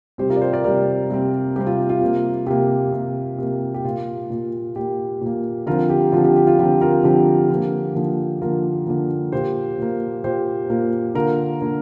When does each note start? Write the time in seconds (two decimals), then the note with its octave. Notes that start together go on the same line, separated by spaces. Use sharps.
0.18 C3 G3 C4 G4 C5
0.30 F4 A#4
0.36 D5
0.42 G4 C5
0.52 A#4 D5
0.64 C3 G3 C4 A#4 D5
1.10 C3 G3 C4
1.56 C3 G3 C4 G4
1.67 F4
1.89 F4
2.01 C3 A#3
2.47 C3 A#3 G4
2.92 C3 A#3
3.39 C3 A#3
3.74 G4
3.84 A#2 A#3 F4
4.30 A#2 A#3
4.76 A#2 A#3 G4
5.21 A#2 A#3
5.66 D3 F3 C4 F4 A#4
5.90 G4
6.12 D3 F3 C4 F4
6.24 G4
6.36 G4
6.47 F4
6.59 D3 F3 C4 G4
6.81 F4 A#4
7.04 D3 F3 C4 G4
7.50 D3 F3 A#3
7.95 D3 F3 A#3
8.42 D3 F3 A#3 F4 A#4
8.86 D3 F3 A#3
9.32 A#2 A#3 G4 C5
9.78 A#2 A#3
10.24 A#2 A#3 G4 C5
10.70 A#2 A#3
11.15 D3 A#3 F4 A#4
11.61 D3 A#3